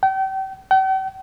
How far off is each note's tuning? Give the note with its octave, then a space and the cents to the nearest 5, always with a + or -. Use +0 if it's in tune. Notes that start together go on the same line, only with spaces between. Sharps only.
G5 -35
G5 -45